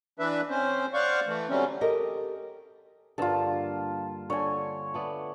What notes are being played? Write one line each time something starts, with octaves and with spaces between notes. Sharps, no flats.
E3 D4 B4 E5
C4 C#4 C5
C5 D5 F5 F#5 C#6
E3 A3
D3 F#3 G3 A3 C4 C#4
G4 A4 A#4 D#5
G2 D3 A#3 F4 A5
D3 C#5 G#5
A3 B3 D5